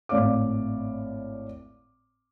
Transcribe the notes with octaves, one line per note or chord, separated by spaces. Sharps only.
G#1 A2 D5 F5 D6